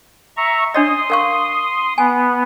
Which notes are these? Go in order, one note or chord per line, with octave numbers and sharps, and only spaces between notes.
E5 A#5 C#6
D4 C#5 D#5 C6 D#6
A#4 F5 C#6
B3 G#5